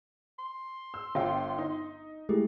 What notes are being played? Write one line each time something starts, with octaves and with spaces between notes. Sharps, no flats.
C6
E6
G1 F4 G5
D#4
G#3 A3 E4 G4 G#4